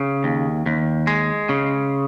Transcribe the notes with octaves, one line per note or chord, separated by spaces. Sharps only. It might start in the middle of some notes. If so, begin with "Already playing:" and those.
Already playing: C#3
D#2
D#2
G#3
C#3